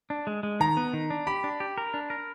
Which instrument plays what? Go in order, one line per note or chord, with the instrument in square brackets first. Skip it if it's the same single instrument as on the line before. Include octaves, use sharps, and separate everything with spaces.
[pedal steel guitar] D4
G#3
G#3
[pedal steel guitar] D#3 [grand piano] A#5
[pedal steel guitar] B3
D#3
D4
[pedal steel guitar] G4 [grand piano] B5
[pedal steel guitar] D4
G4
A#4
D4
A#4